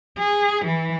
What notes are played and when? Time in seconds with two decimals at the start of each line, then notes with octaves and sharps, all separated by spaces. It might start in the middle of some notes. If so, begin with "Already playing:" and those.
0.18 G#4
0.65 E3